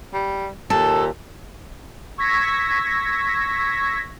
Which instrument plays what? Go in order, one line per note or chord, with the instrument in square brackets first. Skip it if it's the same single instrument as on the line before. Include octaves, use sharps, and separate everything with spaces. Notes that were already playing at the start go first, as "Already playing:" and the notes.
[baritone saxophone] G3
[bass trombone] D#2 [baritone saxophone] A#2 [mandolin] A4 [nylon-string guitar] A5
[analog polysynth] C#6 E6 G#6 A#6 B6